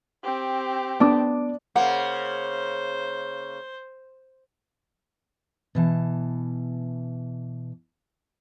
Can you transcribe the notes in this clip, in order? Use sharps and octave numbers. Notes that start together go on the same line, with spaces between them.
C4 G4
B3 D4 D6
C#3 A#3 C5 F#5
B2 E3 A5